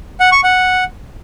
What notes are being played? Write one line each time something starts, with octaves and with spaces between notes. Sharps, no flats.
F#5
C#6
F#5